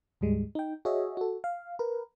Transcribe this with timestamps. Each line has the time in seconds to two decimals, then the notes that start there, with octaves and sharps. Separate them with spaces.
0.21 D2 G#2 G3 G#3
0.55 D#4 G5
0.85 F#4 G#4 C#5 D#5 E5
1.17 F#4 A4
1.44 F5
1.79 A#4 B4